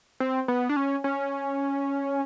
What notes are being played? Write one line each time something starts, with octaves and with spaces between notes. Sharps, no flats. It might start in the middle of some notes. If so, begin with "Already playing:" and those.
C4
B3
D4
C#4
C#4